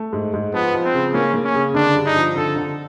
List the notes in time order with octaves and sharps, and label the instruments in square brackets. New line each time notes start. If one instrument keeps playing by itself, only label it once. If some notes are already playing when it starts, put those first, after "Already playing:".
Already playing: [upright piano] A3
G#2
G#2
[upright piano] F3 [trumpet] B3
[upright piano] F3
[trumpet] C4
[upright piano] C#3
[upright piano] A#3 [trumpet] C#4
[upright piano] A#3
[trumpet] C#4
[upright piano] C#3
[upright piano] D3 [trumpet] D4
[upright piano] G2
[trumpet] D#4
[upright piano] F3
[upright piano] D3 [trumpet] A4
[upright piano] D3